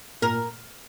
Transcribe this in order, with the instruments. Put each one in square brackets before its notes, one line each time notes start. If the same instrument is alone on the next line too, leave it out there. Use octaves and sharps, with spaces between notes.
[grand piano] A#2 [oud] A#4